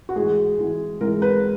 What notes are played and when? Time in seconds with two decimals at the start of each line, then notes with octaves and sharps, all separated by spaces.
0.09 F#4
0.16 G#2 E3 G#3 G#4
0.59 G#2 E3 G#3
1.00 G#2 E3 G#3 A#4
1.22 B4